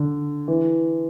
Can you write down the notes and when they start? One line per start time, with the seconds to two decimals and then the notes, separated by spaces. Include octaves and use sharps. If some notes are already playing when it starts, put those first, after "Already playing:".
Already playing: D3
0.48 E3